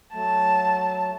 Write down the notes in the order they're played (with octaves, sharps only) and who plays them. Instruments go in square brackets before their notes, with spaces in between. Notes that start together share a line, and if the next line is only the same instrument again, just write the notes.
[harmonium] F#3 A3 [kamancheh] A5